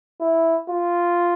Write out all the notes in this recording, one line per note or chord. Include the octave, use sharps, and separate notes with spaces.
E4
F4